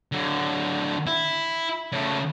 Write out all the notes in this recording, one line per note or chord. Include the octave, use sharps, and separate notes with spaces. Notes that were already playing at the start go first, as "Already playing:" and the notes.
D3 F#3
E4
C#3 A3